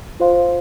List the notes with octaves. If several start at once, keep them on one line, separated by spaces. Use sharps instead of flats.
F4 C5 F5 C6